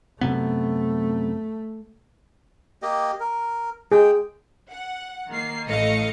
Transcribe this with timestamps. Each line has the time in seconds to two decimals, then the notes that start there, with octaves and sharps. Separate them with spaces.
0.21 F#2 C3 A3 B3
2.82 A#3 G4 D#5
3.20 A#4
3.92 G#3 G#4 G5
4.71 F#5
5.30 D#3 A#3 C7
5.66 A1 A2 A3 D#5 F5 C#7